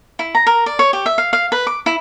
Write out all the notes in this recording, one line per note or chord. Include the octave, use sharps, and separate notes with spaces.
E4
A#5
A#4
D5
C#5
G4
E5
F5
F5
B4
D6
E4